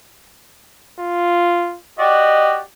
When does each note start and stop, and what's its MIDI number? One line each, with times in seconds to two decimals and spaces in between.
1.00 1.78 65
1.99 2.60 66
1.99 2.60 67
1.99 2.60 74
1.99 2.60 75